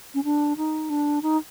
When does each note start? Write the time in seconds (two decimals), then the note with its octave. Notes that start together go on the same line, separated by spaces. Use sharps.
0.14 C#4
0.24 D4
0.57 D#4
0.90 D4
1.22 D#4